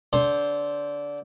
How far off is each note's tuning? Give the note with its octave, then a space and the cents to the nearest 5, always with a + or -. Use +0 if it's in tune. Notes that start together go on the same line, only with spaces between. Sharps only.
D3 -20 C5 +0